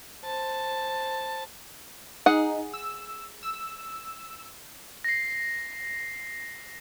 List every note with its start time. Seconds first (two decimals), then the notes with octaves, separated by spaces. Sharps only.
0.23 C5 A5
2.26 D#4 G#4 F#5
2.74 E6
3.43 E6
5.04 A#6 C7